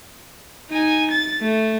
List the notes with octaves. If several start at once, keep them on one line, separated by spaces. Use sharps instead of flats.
D#4 G#5
A6
A3